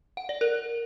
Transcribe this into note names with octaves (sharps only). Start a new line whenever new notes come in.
F#5
D5
A#4